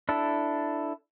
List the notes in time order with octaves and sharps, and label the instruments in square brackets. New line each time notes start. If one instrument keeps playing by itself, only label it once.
[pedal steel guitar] D4 E4 A4